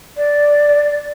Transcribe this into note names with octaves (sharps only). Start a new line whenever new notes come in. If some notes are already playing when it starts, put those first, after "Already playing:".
D5